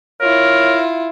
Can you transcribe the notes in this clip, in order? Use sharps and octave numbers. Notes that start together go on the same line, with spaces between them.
E4 F4 A#4 C#5